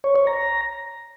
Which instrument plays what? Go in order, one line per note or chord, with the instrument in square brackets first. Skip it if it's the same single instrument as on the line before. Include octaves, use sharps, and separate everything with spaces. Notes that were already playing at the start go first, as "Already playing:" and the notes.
[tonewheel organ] C#5
C#5
A#5